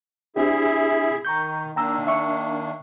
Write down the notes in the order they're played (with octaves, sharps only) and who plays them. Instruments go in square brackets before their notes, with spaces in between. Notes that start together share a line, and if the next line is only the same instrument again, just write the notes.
[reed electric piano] C4 D4 G4 [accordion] E4 G#4 E5
[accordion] D#3 [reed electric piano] A#5 C#6 G6
[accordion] D#3 A#3 D4 [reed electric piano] G5 A#5 E6
[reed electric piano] E5 C#6